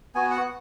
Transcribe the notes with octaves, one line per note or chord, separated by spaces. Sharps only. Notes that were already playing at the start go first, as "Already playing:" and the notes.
B3 F#4 G#5
F#5